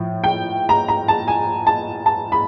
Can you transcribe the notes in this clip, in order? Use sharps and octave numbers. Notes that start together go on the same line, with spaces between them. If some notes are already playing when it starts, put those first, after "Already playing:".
Already playing: A2 F3
G5
A#5
A#5
A5
G#5
A5
A5
B5